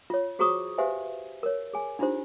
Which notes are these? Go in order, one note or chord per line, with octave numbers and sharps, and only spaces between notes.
F4 C#5
F#4 G#4 C5 A#5 C#6 D#6
G4 B4 C5 E5 F5 G#5
A#4 C#5
G#4 G#5
D4 D#4 F4 G4 C5